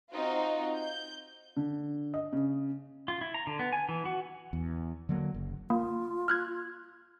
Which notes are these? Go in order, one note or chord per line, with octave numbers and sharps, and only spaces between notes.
C4 D#4 F4 F#4
G6
D3
D#5
C#3
F4
E4
A#5
D3
B3
G#5
E3
F#4
E2
D3 F#3 A#3
F#1
A#3 F4
F6 F#6 G#6